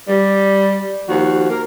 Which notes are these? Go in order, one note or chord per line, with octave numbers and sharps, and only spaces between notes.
G3
D#2 F3 F#4
A#3 A#4